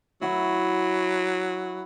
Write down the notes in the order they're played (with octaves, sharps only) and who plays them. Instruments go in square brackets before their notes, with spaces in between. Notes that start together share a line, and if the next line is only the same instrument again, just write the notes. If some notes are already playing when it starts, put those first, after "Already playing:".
[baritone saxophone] F#3 [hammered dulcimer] E4 F#4 E5